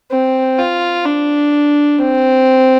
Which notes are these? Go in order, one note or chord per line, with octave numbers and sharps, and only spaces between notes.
C4
F4
D4
C4